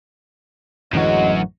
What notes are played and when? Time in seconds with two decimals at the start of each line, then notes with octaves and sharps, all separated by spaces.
0.93 A1 F#2 D3 E3 G#3 F#4